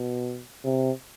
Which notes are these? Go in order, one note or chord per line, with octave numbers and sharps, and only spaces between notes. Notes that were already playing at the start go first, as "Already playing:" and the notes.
Already playing: B2
C3